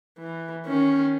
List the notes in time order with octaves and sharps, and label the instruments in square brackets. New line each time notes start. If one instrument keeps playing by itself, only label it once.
[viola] E3
D#3 C#4